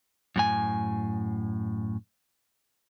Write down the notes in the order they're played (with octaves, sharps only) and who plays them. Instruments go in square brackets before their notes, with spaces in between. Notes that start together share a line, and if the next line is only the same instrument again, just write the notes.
[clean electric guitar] F#2 A2 G#5